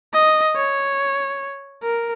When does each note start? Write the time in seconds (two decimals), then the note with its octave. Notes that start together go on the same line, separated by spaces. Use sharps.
0.14 D#5
0.56 C#5
1.83 A#4